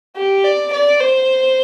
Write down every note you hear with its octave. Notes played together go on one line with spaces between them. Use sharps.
G4
D5
D5
C5